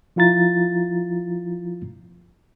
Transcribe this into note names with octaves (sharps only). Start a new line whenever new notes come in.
F3 E4 F4 A#5 A6